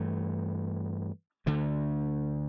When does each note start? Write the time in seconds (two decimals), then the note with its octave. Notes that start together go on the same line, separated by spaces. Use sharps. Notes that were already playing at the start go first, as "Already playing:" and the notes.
Already playing: G2 E3 A3
1.46 D2 D3 A3